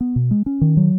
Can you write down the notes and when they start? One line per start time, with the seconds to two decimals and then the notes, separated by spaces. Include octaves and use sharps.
0.01 B3
0.16 B2
0.31 G#3
0.46 C#4
0.61 D#3
0.77 F#3